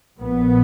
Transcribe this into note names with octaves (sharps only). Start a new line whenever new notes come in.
A#1 A#2 B3